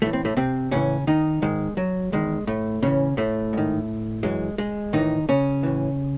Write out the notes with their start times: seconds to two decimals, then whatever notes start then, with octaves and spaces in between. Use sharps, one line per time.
0.02 A2 E3 A3
0.13 C4
0.25 A2 A3
0.37 C3 C4
0.71 A2 C#3 E3 C#4
1.07 D#3 D#4
1.42 G#2 D#3 G#3
1.77 F#3
2.12 E2 D#3 G#3
2.47 A2 A3
2.82 A2 C#3 E3 C#4
3.17 A2 A3
3.53 G#2 D#3
4.23 F#2 E3 G#3
4.58 G#3
4.93 A2 D#3 E3 D#4
5.29 C#3 C#4
5.63 A2 E3